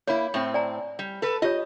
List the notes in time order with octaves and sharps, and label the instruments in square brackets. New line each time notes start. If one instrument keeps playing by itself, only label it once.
[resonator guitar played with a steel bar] A#3 E4 [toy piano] C#5 B5
[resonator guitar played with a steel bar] A2 C4
[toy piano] D5 G#5 A#5
[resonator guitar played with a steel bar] G3
A4 B4
[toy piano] F4 G4 C#5 [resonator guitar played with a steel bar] D#5